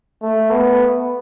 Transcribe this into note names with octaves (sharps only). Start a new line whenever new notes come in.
A3
B3